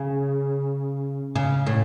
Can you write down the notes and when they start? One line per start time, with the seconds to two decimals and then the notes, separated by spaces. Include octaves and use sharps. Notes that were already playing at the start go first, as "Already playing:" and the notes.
Already playing: C#3
1.35 C#3
1.66 A2